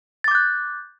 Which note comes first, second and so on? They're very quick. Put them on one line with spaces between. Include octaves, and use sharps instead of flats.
A6 D6 G6 F#6